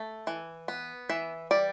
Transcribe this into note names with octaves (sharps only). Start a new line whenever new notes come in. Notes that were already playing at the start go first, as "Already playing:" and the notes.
Already playing: A3
E3
B3
E3 E5
G3 D5